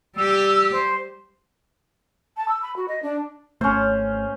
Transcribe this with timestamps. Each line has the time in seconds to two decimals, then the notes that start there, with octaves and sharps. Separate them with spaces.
0.17 G3 G4 E6
0.72 C5
2.37 A5
2.48 E6
2.62 B5
2.76 F#4
2.88 D#5
3.02 D4
3.61 G#1 A3 C#4 C5